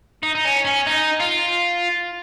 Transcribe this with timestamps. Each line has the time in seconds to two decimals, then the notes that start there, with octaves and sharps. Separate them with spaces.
0.23 D#4
0.35 D#4
0.45 C#4
0.65 C#4
0.87 D#4
1.20 F4